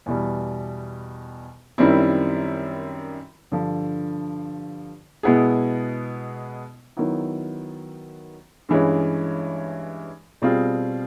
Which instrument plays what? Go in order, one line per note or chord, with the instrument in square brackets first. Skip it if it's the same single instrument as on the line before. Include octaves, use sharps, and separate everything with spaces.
[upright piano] E2 B2 G3
F#2 D#3 G3 C4 E4
G2 D3 F3
B2 G#3 B3 E4 G#4
D#3 F#3 B3 E4
G2 E3 G#3 C#4
B2 G3 C4 F4 G#4